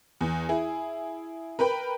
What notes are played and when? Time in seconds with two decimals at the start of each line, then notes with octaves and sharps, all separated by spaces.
0.21 E2
0.49 E4 G#4
1.59 A#4 B4 G5 B5